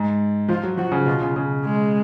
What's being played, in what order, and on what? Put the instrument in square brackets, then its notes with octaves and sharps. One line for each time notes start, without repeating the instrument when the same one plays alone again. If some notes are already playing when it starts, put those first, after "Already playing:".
Already playing: [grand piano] G#2
[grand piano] F3 [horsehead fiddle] F4
[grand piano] F#3
[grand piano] F3 [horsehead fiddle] F#4
[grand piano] C#3
[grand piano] B2 [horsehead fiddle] F4
[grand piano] C#3
C#3
[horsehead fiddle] G#3